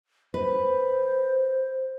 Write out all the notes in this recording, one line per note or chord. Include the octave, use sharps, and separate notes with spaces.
B4 C5